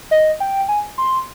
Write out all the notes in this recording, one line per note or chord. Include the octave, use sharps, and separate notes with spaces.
D#5
G5
G#5
C6